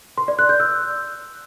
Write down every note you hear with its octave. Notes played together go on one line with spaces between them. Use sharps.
C6
D5
F#6
G6
E6